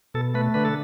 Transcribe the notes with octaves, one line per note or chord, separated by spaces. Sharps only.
B2 A4
A3 B4
D3 B4
A4